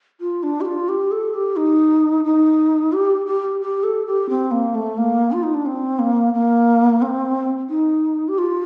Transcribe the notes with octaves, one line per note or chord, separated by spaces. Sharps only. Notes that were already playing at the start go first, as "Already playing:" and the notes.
F4
D4
G4
F4
G4
A4
G4
D#4
D#4
G4
G4
G4
A4
G4
C4
A#3
A3
A#3
F4
D#4
D4
C4
A#3
A#3
C4
D#4
G4
F4